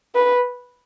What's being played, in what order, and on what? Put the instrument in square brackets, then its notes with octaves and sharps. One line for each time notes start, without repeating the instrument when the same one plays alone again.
[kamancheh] B4